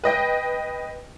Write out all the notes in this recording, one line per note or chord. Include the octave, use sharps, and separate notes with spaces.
B4 D#5 G5